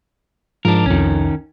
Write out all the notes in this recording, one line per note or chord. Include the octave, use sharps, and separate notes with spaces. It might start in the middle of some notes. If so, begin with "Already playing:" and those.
G#2 F3 D4 A#4
C2 F2 D#3 C#4